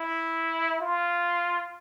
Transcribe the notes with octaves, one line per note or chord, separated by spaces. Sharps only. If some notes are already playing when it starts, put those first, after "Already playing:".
Already playing: E4
F4